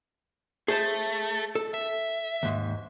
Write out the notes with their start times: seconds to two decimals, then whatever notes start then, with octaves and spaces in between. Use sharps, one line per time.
0.68 A3 G#4 C5 A5
1.55 A4
1.74 E5
2.43 D#2 G#2